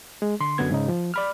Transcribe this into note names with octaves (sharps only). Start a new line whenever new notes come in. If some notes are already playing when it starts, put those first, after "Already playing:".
G#3
D3 C6
F#2 D3 F#3 B3 G#6
G#2 C#3 D#4
F3
D5 B5 F6